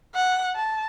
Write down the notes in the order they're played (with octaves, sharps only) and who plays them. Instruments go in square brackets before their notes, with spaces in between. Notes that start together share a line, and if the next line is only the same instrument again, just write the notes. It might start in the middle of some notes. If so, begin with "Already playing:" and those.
[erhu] F#5
A5